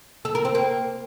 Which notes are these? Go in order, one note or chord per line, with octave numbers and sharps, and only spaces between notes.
A4
A#4
C4
A#3